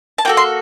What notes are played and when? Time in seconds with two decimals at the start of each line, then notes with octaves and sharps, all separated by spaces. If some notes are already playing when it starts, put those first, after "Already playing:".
0.18 A5
0.25 A#3 F#4 A4 G5
0.37 C6